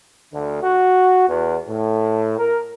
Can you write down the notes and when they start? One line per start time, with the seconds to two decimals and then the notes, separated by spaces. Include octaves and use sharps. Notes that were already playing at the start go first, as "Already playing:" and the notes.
0.33 D2
0.64 F#4
1.29 E2
1.70 A2
2.39 A#4